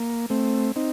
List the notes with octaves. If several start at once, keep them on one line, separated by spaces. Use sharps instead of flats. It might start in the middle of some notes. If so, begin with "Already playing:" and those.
Already playing: A#3
A3 C4
C4 D#4